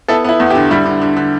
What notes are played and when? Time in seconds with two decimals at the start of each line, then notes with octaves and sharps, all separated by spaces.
0.08 B3 E4 A4
0.24 B3 E4
0.40 E2
0.50 G4
0.55 D3
0.71 G3 E4
0.86 D3
1.02 D3
1.17 D3